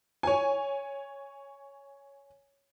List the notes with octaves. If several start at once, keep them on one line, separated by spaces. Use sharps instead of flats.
C#5 G#5